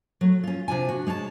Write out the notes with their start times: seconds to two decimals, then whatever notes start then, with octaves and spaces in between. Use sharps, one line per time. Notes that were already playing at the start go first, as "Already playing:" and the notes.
0.21 F#3 A3
0.43 C#4 F4
0.68 C3 D4 F4 G#5
0.89 F#4
1.07 G#3 C#5 D5 A5